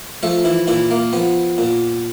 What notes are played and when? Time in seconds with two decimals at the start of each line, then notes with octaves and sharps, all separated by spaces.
0.23 F3 A3 A4
0.45 E3 E4
0.67 A#2 E3 E4
0.91 A#3
1.13 F3 B3
1.58 A#2